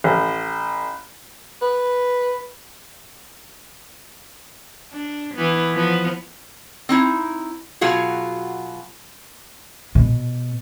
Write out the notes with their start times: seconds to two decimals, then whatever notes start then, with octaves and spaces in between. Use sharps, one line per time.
0.04 A1
1.62 B4
4.92 D4
5.35 E3 B3
5.74 F3 B3
6.89 C4 D#4 E4
7.81 B2 F#3 F4 F#4 G#4
9.95 B2